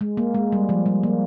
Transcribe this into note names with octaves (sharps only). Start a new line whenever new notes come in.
G#3
A#3
G#3
G3
F3
G3
A#3